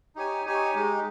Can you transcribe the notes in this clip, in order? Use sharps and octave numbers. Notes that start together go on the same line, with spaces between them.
D#4 G4 C#5 G#5
D#4 G4 C#5 G#5
G#3 D#4 G4